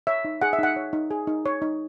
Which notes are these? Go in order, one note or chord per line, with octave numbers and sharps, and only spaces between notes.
C#5 E5
D#4
G#4 F#5
E5
D#4 F#5
C#5
D#4
G#4
D#4
C#5
D#4